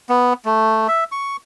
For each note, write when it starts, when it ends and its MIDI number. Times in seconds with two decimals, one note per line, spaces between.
0.09 0.33 59
0.45 0.88 57
0.88 1.04 76
1.12 1.37 85